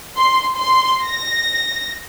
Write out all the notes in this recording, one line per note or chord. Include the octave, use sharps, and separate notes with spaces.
C6
C6
A#6